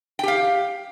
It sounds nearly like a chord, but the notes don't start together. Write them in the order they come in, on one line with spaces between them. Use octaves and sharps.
G5 G4 F5